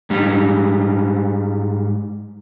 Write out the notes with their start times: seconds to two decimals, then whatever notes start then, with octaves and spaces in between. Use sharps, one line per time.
0.10 G#2 G3